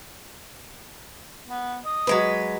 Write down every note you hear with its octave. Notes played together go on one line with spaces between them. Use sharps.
B3
D#5
F#3 G#3 B4